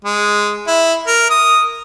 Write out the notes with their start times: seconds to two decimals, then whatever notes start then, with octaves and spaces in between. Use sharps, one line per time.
0.04 G#3
0.67 E4
1.07 A#4
1.30 D#6